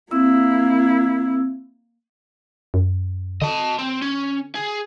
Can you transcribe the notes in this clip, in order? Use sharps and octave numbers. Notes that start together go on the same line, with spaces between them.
A#3 C4 E4 E6
F#2
D3 D#5 A5
C4
C#4
G#4